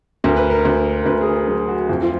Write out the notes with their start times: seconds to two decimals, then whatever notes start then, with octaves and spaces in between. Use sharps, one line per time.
0.24 D2 A#4
0.37 B4
0.50 A#4
0.65 D2
1.01 A#4
1.06 D2 B4
1.21 G#4
1.27 A#4
1.48 F#3 G#4
1.68 F#4
1.89 F2 F4
2.02 F4